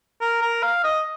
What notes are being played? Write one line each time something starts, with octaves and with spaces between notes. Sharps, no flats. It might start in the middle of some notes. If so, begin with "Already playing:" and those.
A#4
A#4
F5
D#5